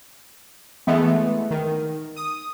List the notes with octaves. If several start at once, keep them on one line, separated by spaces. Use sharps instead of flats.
E3 G#3 A3 B3
D#3
D#6